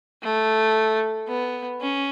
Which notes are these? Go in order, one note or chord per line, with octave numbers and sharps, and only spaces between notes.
A3
B3
C#4